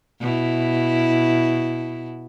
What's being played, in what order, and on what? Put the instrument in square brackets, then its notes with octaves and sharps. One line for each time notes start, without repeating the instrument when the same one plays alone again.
[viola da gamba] B2 E4